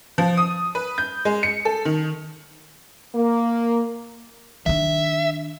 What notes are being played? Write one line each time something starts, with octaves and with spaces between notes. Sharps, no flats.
F3
D#6
B4
G6
G#3
C#7
A4
D#3
A#3
D#3 D4 E5